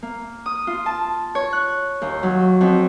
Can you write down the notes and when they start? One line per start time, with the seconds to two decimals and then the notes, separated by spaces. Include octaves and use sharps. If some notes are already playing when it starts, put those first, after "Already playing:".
0.03 A#3
0.46 D#6
0.67 F4
0.86 A5
1.35 C#5
1.53 F#6
2.02 D#2
2.23 F#3
2.61 F2